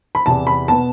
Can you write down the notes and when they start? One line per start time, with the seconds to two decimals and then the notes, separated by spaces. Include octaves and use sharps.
0.15 B5
0.25 E2 C3 E3 A5
0.47 B5
0.68 B2 B3 A5